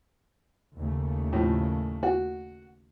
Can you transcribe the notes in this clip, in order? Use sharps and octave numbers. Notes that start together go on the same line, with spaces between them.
D#2 C#3 A3
A2 F3
F#4